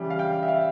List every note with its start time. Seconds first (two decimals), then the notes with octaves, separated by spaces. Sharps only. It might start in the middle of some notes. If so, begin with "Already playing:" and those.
Already playing: C#3 E3 G3
0.10 F5
0.19 G5
0.43 E5
0.48 F5